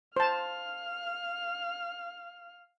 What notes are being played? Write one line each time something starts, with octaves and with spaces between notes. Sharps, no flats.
C5 F5 A5 F6